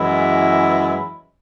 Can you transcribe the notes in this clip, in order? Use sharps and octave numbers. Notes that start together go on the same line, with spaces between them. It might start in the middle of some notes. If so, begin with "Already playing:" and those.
Already playing: F#2 E3 G#3 E4